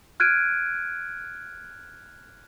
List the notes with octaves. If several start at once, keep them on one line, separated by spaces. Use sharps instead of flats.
F6 F#6 G#6 D7 D#7